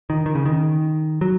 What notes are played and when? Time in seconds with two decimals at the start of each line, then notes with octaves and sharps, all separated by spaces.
0.10 D#3
0.26 D#3
0.35 C#3
0.45 D#3
1.21 F#3